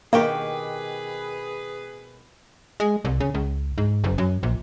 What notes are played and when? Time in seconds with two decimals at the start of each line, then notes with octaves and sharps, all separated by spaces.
0.13 B2 D#3 A#3 G4 G#4 B4
2.80 G#3
3.05 C2
3.20 C#3
3.34 C#2
3.78 G#2
4.04 F#1
4.18 F#2
4.43 A#1